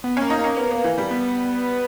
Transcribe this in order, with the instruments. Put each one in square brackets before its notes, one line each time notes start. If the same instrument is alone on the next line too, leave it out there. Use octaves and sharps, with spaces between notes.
[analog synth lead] B3
[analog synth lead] A#3 [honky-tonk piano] C#4
[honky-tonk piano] D#4
[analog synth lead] A#3 [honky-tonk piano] C#4
[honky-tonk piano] B3
B3
E3
G3
[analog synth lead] B3